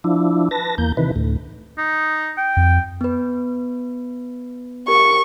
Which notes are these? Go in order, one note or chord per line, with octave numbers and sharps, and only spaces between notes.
F3 D4 E4
B4 A5 A#6
E2 A#3 G6
C3 D#3 E3 B4
D2 A2
D#4
G5
F2
B3 B4
G4 A#4 C#6